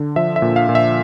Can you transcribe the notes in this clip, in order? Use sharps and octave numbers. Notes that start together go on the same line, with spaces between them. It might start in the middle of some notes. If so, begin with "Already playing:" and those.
Already playing: D3
F3 E5
E5
A#2
F5
A#2
E5